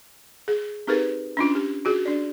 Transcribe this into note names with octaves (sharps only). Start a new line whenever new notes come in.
G#4
C4 D#4 G4 G#4 A#4 B4
C#4 D4 F4
G4
F4 F#4 G#4
D4 D5